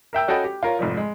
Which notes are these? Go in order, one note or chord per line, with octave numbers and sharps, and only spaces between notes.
A#4 E5 G5 E6
C#4 F#4 A4 D#5 G5 B5
G4
F4 A#4 C#5
F1 G#2 F3
G#3